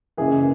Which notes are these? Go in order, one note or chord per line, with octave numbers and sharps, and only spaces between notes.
F#1 F#2 E3 G#4